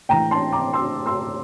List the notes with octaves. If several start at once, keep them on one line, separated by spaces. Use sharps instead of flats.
A2 E3 G5 A#5
A5 C6
A#5 D6
C6 E6
C6 E6